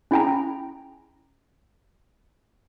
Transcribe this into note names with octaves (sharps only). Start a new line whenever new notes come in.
C#4 E4 G#4 G5 G#5 A#5